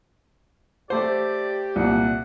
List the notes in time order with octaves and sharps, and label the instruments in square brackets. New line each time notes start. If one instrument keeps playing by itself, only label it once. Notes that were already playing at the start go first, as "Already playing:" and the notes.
[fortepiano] A3 C5 [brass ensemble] G4 [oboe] D5
[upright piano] C2 A#2 [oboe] F#5